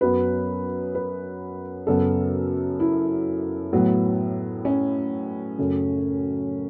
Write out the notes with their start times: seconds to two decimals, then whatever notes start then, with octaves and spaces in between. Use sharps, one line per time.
0.01 F#2 F#3 B3 B4
0.95 B4
1.87 F#2 C#3 F#3 B3 A4
2.80 E4
3.73 A2 F#3 B3
4.65 C#4
5.58 F#2 C#3 A3